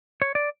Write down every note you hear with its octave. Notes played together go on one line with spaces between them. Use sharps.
C#5
D5